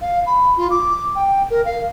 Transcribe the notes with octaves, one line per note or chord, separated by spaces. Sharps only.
F5
B5
F4
D6
G5
A#4
F5